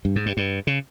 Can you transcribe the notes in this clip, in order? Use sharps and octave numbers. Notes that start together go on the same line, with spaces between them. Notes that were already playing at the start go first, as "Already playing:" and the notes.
G2
G#2
G2
G2
C#3